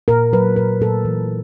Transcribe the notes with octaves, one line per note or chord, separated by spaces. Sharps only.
A#2 A#4
F#3 B4
A#2 A#4
A#2 A4
E3